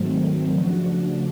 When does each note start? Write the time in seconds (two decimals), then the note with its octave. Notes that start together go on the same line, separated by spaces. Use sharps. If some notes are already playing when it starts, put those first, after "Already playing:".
Already playing: G#2 D#3 F#3 A3 C4
0.50 C#3 F3 A3 D4 F#4